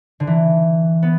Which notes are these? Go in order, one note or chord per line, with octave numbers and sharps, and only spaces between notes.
D3
E3
B3